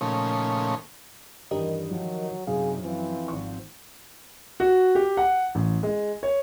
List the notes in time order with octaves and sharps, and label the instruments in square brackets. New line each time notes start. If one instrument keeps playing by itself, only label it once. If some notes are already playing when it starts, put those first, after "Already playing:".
[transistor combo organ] A#2 C#3 F3 A3 C#4 D#4
[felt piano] E2 G2 [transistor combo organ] D#3 [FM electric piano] G4 A#4 D#5
[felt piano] F3 [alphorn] F#3
[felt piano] F#2 [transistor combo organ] C3 D#4 [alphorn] G#4 [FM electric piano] F5
[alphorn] E3 [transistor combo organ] F3 C4
[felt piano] G#1 C#6
[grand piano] F#4
G4
F#5
A1
G#3
C#5